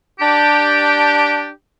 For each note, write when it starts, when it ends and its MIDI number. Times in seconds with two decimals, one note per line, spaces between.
0.20 1.48 62
0.20 1.48 67